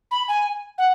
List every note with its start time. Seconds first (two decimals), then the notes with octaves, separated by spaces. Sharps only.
0.11 B5
0.28 G#5
0.78 F#5